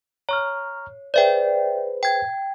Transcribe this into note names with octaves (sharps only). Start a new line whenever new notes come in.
C#5 A#5 C#6 F6
G#4 B4 C5 D5 E5 G5
G5 G#6